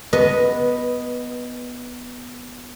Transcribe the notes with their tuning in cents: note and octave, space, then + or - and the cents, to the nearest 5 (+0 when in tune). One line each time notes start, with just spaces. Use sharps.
B3 +0 B4 -15 D#5 +0